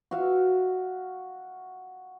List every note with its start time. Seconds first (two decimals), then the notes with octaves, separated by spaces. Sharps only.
0.11 F#4 E5 F5